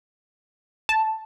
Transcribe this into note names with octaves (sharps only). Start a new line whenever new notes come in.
A5